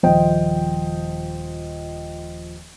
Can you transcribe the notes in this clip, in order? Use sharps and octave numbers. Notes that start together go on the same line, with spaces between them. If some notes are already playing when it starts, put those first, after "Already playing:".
D#1 F3 C5 D#5 G5